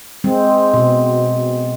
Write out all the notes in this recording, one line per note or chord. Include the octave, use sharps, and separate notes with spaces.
G#3 C4
B2